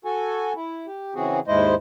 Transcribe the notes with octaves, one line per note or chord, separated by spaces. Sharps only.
F#4 A4 G#5
E4
G4
C#3 E3 C4 F#4 G#4
D#2 G#2 G#3 E4 C5 D#5